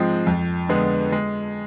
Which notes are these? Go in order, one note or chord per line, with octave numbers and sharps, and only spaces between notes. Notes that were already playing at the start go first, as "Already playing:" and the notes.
Already playing: G#2 F3 G#3 C4
F2
D3 G#3 B3
G#3